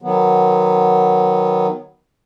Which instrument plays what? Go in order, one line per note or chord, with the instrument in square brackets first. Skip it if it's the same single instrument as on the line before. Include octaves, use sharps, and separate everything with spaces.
[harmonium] D#3 F#3 B3